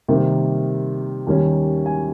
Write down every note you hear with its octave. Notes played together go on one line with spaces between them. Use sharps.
C3 D#3 G3 A#3
D#2 D#3 G3 C#4
G#5